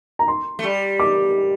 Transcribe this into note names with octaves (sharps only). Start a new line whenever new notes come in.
A#5
C6
A3
G3
D6